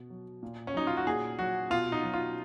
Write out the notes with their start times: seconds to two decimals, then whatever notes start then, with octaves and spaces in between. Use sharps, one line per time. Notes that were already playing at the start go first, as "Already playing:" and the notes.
Already playing: B2
0.10 F#3
0.43 A#2
0.67 C#4
0.74 F#3 D#4
0.87 F4
0.97 F#4
1.07 A#2 G#4
1.38 F#3 F#4
1.70 B2 F4
1.92 D#4
2.03 F#3
2.14 F4